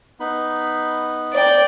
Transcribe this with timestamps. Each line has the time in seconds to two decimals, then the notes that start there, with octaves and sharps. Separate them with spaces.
0.20 B3 D#4 B5
1.34 D5 G5